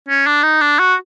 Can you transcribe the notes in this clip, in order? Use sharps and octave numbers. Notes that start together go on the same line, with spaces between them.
C#4
D4
D#4
D4
F#4